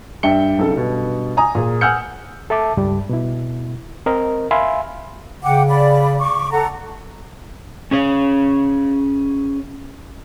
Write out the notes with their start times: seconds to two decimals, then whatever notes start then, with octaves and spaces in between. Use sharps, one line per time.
0.23 G2 D4 E5 G5 C#7 G7
0.59 B1 C#3 A4
0.74 G2 B2
1.37 G#5 A#5 D#6
1.55 A#2 G#4
1.81 F#5 G#5 E6 F6 G6 C#7
2.50 A4 E5 A5 D6
2.77 C#2 G2 G3
3.09 B2 E4
4.06 C4 A#4 D#5
4.51 E5 F5 G#5 B5 C6
5.43 C#3 F#5 G5 D6
5.67 D5 B5
6.20 C#6 D6
6.51 A4 F#5 A#5
7.91 C#4 G#4 C#5